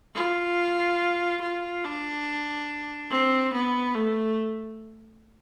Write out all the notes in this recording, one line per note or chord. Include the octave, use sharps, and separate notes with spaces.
F4
F4
D4
C4
B3
A3